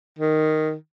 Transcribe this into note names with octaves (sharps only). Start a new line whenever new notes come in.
D#3